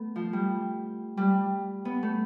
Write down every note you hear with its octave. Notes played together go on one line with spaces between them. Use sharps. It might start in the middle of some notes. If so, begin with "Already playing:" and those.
Already playing: A3 B3
F3
G3
G3
B3
A3